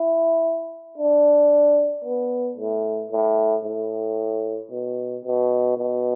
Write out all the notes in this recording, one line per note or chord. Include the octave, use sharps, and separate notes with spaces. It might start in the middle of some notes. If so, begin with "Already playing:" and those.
Already playing: E4
D4
B3
A2
A2
A2
B2
B2
B2